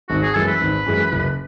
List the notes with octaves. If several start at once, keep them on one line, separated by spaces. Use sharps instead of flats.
G#1 F#4
G#4
F#2 E3 G#3 A4
B4
G#1
F#2 E3 G#3
F#1